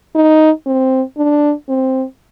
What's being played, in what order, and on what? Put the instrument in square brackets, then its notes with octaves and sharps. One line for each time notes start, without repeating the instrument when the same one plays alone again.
[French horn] D#4
C4
D4
C4